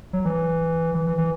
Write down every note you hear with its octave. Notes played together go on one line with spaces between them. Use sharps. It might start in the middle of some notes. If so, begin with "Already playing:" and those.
F#3
E3
E3
E3
E3